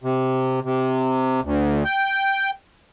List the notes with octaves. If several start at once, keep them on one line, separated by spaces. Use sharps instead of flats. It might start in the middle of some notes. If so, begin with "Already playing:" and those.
C3
C3
D2
G5